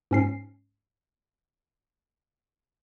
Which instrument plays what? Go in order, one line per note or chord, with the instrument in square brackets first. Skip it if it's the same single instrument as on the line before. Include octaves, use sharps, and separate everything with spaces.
[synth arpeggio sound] G#2 C#4 C7